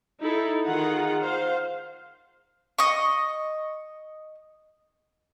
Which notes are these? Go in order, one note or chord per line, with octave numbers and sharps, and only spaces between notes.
D#4 E4 A4
D#3 F4 G#4 F#5 A#5
C5 F5
D#5 C#6